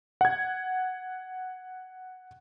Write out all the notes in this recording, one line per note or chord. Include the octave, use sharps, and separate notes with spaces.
F#5 G#6